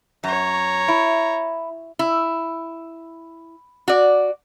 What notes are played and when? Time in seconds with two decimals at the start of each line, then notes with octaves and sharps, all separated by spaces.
0.24 F#2 C#5 A#5
0.88 E4
1.99 E4
3.88 F#4 D5